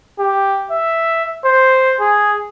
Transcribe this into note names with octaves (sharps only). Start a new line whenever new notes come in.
G4
E5
C5
G#4